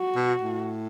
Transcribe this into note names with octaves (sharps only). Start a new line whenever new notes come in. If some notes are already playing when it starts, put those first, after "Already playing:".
Already playing: F#4
B2
A2